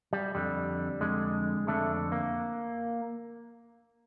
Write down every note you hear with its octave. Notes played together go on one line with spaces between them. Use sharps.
G3
F2 D3 G3
F2 D3 G#3
F2 D3 A3
A#3